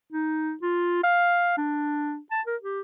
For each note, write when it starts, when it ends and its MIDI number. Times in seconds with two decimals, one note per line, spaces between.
0.12 0.53 63
0.62 1.03 65
1.04 1.55 77
1.57 2.18 62
2.31 2.41 81
2.46 2.56 70
2.62 2.81 67